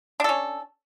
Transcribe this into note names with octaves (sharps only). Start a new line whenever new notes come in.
C#4 D4 A4